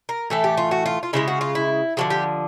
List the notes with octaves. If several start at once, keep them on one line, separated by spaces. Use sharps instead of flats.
A#4
A2 E3 A3 A4
G4
F4
F#4
F4
F4
C#3 F3 G#3 E4
F#4
F4
E4
D3 F3 G#3 F#4
G4